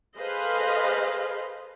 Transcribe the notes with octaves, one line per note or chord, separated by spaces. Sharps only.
G#4 A4 B4 C5 D#5 F5